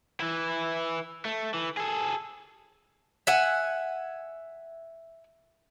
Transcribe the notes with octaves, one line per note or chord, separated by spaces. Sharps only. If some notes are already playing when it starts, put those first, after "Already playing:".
E3 E4
A3
E3
G#4 A4
E5 F#5 G#5